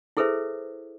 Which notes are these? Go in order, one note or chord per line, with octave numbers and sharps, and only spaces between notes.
E4 G#4 A4 B4 C5 E5